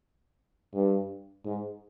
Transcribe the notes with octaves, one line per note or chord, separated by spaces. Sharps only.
G2
G#2